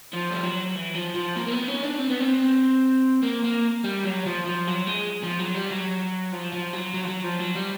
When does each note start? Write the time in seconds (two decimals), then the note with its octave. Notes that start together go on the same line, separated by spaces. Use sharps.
0.13 F3
0.31 G3
0.43 F#3
0.75 E3
0.95 F3
1.15 F3
1.36 A#3
1.47 A#3
1.52 B3
1.68 C#4
1.83 D4
1.98 C4
2.09 B3
2.20 C4
3.22 A#3
3.43 A#3
3.84 G3
4.04 F#3
4.26 F3
4.45 F3
4.67 F#3
4.87 G#3
5.23 F3
5.39 F#3
5.54 G3
5.70 F#3
6.32 F3
6.53 F3
6.73 F#3
6.94 F#3
7.04 F3
7.09 F#3
7.24 F3
7.40 F#3
7.56 G3